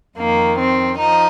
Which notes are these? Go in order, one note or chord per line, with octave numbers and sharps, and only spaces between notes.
F2 D#3 A#3
C4
F3 D#4